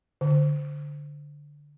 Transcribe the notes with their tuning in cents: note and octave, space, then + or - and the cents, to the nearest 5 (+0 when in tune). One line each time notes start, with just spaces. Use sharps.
D3 -5